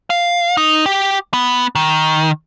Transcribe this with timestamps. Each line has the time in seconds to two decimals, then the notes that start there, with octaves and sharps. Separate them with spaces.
0.10 F5
0.57 D#4
0.86 G4
1.33 B3
1.75 D#3